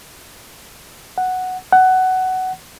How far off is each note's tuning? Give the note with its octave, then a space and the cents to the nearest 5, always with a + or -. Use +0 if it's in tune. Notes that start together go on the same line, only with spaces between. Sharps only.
F#5 +0
F#5 +15